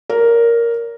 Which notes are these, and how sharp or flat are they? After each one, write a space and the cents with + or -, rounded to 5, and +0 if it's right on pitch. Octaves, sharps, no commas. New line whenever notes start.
A#4 +0 D5 -45